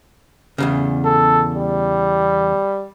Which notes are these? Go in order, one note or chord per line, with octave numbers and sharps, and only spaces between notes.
E2 A#2 C#3
A4
G3